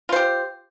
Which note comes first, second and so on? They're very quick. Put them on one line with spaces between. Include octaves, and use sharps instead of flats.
F4 C5 G4